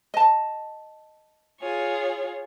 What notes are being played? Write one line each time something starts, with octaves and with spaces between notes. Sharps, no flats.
D#5 A5
F4 G#4 C#5